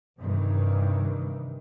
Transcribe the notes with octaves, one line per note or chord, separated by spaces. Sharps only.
G2 C3 D#3 E3